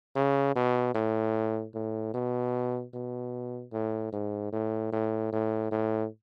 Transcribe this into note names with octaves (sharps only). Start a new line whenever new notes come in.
C#3
B2
A2
A2
B2
B2
A2
G#2
A2
A2
A2
A2